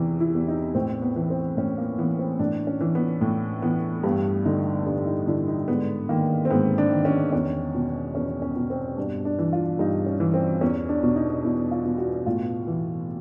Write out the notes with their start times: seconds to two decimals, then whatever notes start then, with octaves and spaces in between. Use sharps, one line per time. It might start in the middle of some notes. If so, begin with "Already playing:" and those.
Already playing: E2 C3 E3
0.20 E4
0.35 E2
0.48 D#4
0.75 A2 C4
1.02 B3
1.16 E3
1.30 C4
1.57 A2 C#4
1.78 A#3
1.98 E3 B3
2.19 C4
2.39 A2 D4
2.67 C#4
2.80 E3
2.95 B3
3.21 A2
3.62 E3 B3
4.03 G2 B3
4.45 D3 D#4
4.86 G2 D4
5.06 D#4
5.27 D3 E4
5.48 D#4
5.68 G#2 B3
6.09 D#3 A#3
6.45 C4
6.50 G#2 B3
6.78 D4
6.92 D#3
7.05 C#4
7.32 E2 C#4
7.75 B2
8.15 E2 C#4
8.42 C#4
8.56 B2
8.70 C4
8.97 G2 D4
9.25 D4
9.39 E3
9.53 F4
9.79 G2 D#4
10.06 C#4
10.20 E3
10.34 C4
10.61 E2 C#4
10.89 D4
11.03 B2
11.16 D#4
11.44 E2 E4
11.71 F4
11.85 B2
11.98 F#4
12.26 A2 F4
12.67 E3